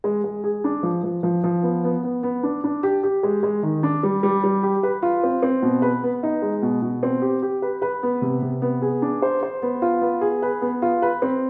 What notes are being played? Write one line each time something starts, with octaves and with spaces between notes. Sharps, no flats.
G#3
G#3
G#4
D4
F3
F3
F3
F3
B3
B3
B3
B3
D4
D4
G4
G4
G#3
G#3
D#3
D4
G3
G3
G3
G4
B4
F4
C4
C4
B2
B4
B3
D#4
G#3
B2
B2
C4
G4
G4
B4
B4
B3
C3
C3
B3
G#4
D4
C5
C5
B3
F4
B3
G#4
B4
B3
F4
B4
C4